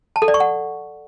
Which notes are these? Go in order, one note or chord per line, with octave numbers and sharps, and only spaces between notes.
A5
A4
D5
C#6
F#5